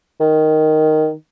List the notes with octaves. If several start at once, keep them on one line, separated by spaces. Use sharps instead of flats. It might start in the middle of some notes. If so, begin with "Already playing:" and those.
D#3